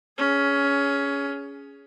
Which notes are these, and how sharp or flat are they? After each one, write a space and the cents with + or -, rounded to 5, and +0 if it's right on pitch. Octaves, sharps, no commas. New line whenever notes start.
C#4 +15 G#4 +0